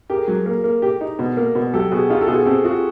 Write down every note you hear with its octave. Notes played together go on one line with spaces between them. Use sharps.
G4 G#4 A#4
F#3
A#3
A#3
G4
D#4
B2
A#3
B2
F#3 G4 A4
B2 F#4 G#4
D#4 F4 G4
A4
B2 F#4 G#4
C4 G4 A4
F4 F#4 G#4